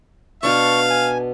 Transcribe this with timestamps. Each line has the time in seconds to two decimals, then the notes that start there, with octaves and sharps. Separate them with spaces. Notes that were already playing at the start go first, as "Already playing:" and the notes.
0.43 B2 D4 F5 A5 C#6
0.90 G#5